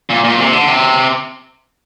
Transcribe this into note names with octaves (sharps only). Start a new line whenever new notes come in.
A#2
A#2
C3
D3
C3